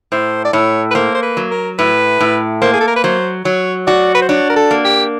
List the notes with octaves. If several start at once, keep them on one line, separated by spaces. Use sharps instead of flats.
A2 C5
D5
A2 C#5
B4
A#3 C5
C5
B4
F#3
A#4
A2 B4
A2
A#3 C5
G#4
A4
A#4
B4
F#3 C5
F#3 C#5
F#4 D5
B4
C5
D4 C#5
A#4
A4
A#3
G4